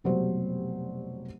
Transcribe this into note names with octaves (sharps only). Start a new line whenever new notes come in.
F1 B2 F#3 G3 G4 C5